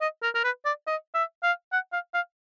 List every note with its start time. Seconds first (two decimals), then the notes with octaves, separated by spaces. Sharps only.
0.01 D#5
0.23 A#4
0.35 A#4
0.44 B4
0.65 D5
0.87 D#5
1.14 E5
1.43 F5
1.72 F#5
1.93 F5
2.14 F5